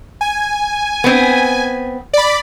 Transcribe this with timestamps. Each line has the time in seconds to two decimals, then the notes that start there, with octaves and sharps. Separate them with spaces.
0.21 G#5
1.04 B3 C4
2.13 D5 B5